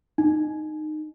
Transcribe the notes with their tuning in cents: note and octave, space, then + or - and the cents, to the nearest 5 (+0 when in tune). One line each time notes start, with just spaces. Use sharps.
D#4 -20